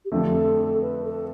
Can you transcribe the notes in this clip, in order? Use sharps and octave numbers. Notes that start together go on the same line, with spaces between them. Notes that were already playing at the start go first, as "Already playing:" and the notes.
G4
F2 D3 F3 A3 A4
B4
A4